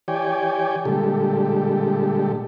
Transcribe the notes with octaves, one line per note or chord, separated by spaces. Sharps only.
E3 G4 C#5 D5 G5 G#5
A#2 D3 G3 G#3 G4 A4